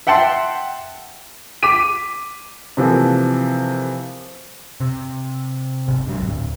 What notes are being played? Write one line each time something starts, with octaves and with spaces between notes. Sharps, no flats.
E5 F#5 G5 A5 C6
D6 B6 D#7
C3 E3 F3 A3 A#3
C3
G#1
G#2 F#3
D1